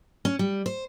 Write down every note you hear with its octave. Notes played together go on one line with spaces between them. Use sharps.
C#4
G3
C5